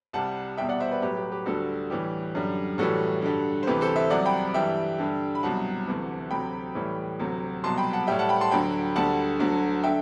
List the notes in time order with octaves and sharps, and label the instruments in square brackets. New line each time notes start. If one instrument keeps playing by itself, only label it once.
[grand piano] C2 C3 G3 F#5 A5
E2 B2 G3 E5 G5
D5 F#5
C5 E5
B4 D5
A2 F#3 G4 B4
G4
G4 B4
D2 D3 G3 F#4 A4
A2 E3 G3 G4
F#2 D3 G3
A2 E3 G3 F#4 A4
G2 D3 G3
C5
D2 C3 E3 G4 B4
A4 C5
C5 E5
C2 C3 F#3 D5 F#5
G5 B5
G2 E3 G3 E5 G5
G2 D3 G3
B5
C2 B2 F#3 F#5 A5
D2 C3 E3
D2 C3 F#3 G5 B5
A2 E3 G3
D2 C3 F#3
C2 B2 F#3 A5 C6
G5 B5
F#5 A5
A2 G3 E5 G5
F#5 A5
G5 B5
A5 C6
D2 D3 F#3 G5 B5
D2 D3 G3 F#5 A5
D2 D3 F#3
D3 E5 G5